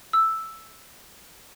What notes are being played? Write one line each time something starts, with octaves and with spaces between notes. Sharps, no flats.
E6